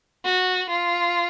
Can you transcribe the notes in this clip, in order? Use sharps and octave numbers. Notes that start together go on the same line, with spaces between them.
F#4
F4